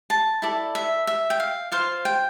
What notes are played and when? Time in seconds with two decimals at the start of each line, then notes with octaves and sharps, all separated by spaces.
0.10 A5
0.42 E4 A4 D5
0.75 E5
1.07 E5
1.30 G5
1.40 F5
1.72 F4 C5 F5
2.05 G5